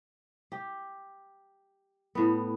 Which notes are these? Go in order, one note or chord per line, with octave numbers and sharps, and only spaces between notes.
G4
A2 B3